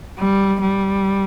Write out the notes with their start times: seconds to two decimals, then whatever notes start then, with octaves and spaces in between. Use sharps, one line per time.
0.19 G3
0.61 G3